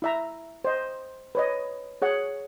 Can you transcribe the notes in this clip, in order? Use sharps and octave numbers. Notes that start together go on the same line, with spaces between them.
E4 E5 A#5
C5 D#5
B4 C#5 D#5
G#4 C#5 F#5